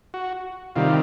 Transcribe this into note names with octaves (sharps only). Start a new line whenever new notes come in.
F#4
C3 D#3 G3 F4